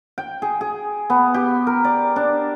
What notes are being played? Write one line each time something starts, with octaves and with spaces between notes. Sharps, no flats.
G5
G#4
G#4
B3
G4
A#4
D5
D4